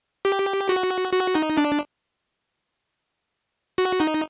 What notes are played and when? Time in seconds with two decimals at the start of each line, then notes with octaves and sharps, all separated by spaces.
0.25 G4
0.69 F#4
1.13 F#4
1.35 D#4
1.57 D4
3.78 F#4
4.00 D#4